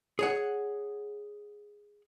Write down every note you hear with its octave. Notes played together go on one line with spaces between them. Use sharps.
G#4 C#5 F#5